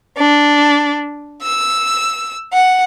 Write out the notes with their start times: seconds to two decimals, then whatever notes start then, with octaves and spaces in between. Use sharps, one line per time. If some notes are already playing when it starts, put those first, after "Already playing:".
0.18 D4
1.42 E6
2.53 F#5